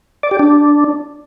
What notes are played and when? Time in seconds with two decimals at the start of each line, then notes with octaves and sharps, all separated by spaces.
0.23 D5
0.31 G4
0.39 D4